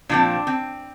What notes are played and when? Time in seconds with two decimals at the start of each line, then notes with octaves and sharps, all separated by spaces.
0.09 A#2 F3 C4 D4
0.47 C4